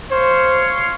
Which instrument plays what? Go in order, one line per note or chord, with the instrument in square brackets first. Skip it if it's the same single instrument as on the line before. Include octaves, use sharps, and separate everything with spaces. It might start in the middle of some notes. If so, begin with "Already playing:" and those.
[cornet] C5 [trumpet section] C#5 F5 C6